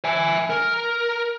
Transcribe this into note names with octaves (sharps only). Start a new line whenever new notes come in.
E5 G#5
A#4